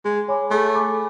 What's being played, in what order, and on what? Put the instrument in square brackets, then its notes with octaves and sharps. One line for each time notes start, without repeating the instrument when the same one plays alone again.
[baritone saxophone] G#3 [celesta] G#4
[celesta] C#5 G#5 B5 D6
[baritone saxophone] A3 [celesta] G#4
[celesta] C#5 G#5 B5 D6